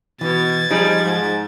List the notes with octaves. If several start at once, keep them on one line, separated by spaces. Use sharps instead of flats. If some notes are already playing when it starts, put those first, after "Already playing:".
B2 E3 G#6 A6
F3 G3 D#4 G#4
G#2